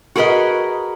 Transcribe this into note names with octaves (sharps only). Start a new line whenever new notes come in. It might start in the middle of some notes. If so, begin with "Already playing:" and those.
F#4 G#4 A#4 B4 D#5